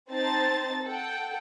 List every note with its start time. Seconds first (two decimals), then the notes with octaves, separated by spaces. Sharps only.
0.10 C4 D#4 C5 A5 A6
0.84 A4 F#5 G5